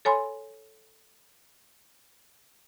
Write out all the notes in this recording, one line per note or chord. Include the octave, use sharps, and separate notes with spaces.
A4 C#5 G#5 B5 C6